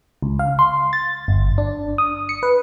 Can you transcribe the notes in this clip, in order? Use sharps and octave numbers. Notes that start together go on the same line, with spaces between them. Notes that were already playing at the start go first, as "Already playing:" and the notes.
C#2
F5
C6
A6
G1
D4
D#6
C#7
B4